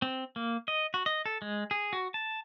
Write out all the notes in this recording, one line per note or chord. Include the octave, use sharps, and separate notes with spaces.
C4
A#3
D#5
F#4
D#5
A4
G#3
G#4
F#4
A5